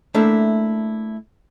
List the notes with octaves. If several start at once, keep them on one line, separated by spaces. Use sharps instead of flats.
A3 A#3 D4 E4 E5